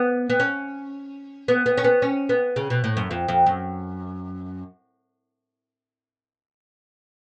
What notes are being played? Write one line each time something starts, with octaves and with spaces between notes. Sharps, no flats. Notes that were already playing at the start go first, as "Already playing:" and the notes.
Already playing: B3
B3
C#4
B3
B3
C#4
B3
C#4
B3
C#3
B2
A2
F#2
F2
F2
F#2